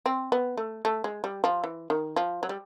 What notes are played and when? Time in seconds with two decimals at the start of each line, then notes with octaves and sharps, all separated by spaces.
0.06 C4
0.32 B3
0.57 A3
0.85 A3
1.04 G#3
1.24 G3
1.44 F3
1.64 E3
1.90 D#3
2.16 F3
2.43 F#3
2.49 G3